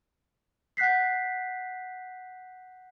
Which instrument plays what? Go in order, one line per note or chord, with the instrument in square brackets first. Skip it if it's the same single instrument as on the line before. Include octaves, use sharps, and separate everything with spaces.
[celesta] F#5 F#6 G6 B6 C7